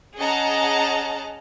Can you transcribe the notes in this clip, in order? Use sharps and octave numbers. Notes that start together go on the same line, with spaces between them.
C#4 G#4 D#5 F#5 A5 A#5